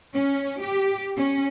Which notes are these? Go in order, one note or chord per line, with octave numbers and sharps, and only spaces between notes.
C#4
G4
C#4